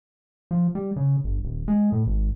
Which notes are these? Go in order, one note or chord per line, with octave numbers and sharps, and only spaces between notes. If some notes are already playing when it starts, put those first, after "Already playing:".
F3
G3
C#3
G1
D#1
G#3
A2
G#1